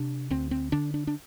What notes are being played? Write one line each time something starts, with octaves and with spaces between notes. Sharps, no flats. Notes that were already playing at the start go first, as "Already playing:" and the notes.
Already playing: C3 D4
D2 C4
C4
D3 D4
D4
D4